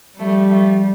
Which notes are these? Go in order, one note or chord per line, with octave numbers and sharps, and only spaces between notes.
F3 G3 A3
F3 A3